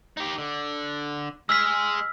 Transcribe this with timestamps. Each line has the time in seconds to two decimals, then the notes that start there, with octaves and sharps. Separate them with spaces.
0.17 D#4 G4
0.38 D3
1.49 G#3 G#4 E6 F6 B6